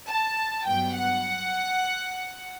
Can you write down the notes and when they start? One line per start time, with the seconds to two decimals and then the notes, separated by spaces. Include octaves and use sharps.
0.08 A5
0.66 G2 F#3 B3 G5
0.95 F#5